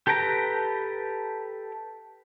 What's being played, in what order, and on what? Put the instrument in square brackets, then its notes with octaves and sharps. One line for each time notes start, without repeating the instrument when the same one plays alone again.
[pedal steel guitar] G4 A4 B4 G5 A#5